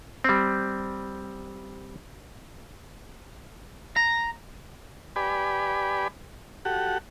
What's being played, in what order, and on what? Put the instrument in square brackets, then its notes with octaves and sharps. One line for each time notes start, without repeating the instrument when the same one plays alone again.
[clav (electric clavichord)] G3 C4
[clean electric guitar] A#5
[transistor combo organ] G4 B4 D5 G#5 B5
F#4 G4 A4 F#5